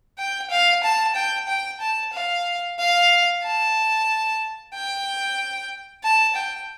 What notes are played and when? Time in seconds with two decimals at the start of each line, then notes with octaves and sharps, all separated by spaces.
0.18 G5
0.50 F5
0.84 A5
1.16 G5
1.48 G5
1.80 A5
2.13 F5
2.79 F5
3.44 A5
4.74 G5
6.03 A5
6.35 G5